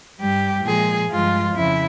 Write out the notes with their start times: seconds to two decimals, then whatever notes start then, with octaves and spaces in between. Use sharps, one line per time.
0.21 G2 G3 G4
0.65 A#2 F3 G#3 G#4
1.10 G2 F3 G#3 F4
1.55 F2 C#3 F3 E4